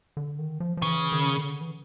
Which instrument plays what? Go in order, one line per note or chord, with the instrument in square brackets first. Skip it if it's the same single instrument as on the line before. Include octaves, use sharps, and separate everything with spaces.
[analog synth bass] D3
D#3
F3
F3
[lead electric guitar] C#3 [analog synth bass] E3
[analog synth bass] D#3
D3
E3